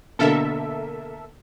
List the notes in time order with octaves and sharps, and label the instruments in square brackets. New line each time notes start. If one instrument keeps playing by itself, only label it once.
[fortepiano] B2 D3 A#3 [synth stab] A4 A#4 E5